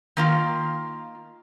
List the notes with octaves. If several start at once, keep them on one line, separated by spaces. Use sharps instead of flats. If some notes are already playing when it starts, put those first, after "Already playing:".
D#3 A#3 F4